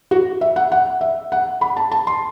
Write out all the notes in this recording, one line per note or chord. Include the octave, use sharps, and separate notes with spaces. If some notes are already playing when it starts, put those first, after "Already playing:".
F#4
E5
F#5
F#5
E5
F#5
B5
A5
A5
C6